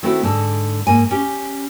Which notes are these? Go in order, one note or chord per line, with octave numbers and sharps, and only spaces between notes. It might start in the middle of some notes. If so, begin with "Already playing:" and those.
D#3 A3 B3 C4 E4 F#4
G#2 D3 A4
G#2 A#3 G#5
C#4 G4